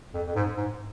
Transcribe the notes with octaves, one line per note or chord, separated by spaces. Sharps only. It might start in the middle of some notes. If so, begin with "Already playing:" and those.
F2
F2
G#2
G#2